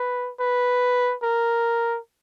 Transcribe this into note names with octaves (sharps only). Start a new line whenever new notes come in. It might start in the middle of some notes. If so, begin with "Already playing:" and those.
Already playing: B4
B4
A#4